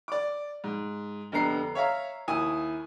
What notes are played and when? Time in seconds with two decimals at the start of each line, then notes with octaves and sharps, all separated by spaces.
0.08 D5 D6
0.64 G#2
1.32 F1 D3 B3 A#5 C7
1.75 C#5 E5 F5 A#5
2.28 D#2 E4 G#5 D#6